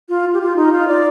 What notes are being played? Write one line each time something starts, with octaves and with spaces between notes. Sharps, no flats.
F4
G4
F4
D#4
F4
D5